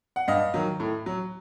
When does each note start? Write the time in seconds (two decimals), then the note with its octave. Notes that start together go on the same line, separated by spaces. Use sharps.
0.16 F#5
0.28 G2 D#5 F5
0.54 D#3 F#3
0.80 A2
1.06 F#3